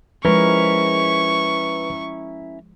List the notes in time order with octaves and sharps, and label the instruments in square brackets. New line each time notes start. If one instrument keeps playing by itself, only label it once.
[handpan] F3 G#3 [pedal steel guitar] C#4 E4 A#4 [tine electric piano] B4 [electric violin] C#6